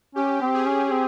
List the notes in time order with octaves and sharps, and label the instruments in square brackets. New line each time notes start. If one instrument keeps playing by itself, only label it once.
[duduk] C#4 [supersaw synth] G4
[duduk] C4
[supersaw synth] G#4
[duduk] C#4
C4